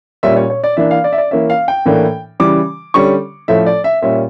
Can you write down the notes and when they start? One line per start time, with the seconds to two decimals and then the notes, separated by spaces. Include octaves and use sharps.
0.23 A#2 G3 C#4 E5
0.37 C#5
0.50 C#5
0.64 D5
0.77 E3 A#3 D4 E5
0.91 F5
1.04 D5
1.12 E5
1.18 D5
1.31 E3 A#3 C#4 E5
1.50 F5
1.68 G5
1.86 A2 E3 A#3 D4
2.40 C#3 E3 G3 D6
2.94 D3 G3 C#4 C#6
3.48 A2 F3 A3 C#4 E5
3.66 D5
3.84 E5
4.02 A#2 G3 C#4 E5